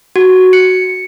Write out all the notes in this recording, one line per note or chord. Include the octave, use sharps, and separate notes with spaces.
F#4
C#7